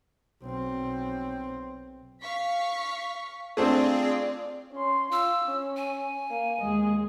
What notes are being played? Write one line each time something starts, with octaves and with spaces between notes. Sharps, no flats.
B1 C4
F5 C#6 B6
A3 C4 D4 F4 G#4 C5 D5
C#4 C6
F4 E6
C#4
G#5
A#3
D#2 G#3 G#4 D#5